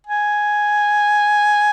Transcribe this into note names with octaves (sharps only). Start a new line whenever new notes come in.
G#5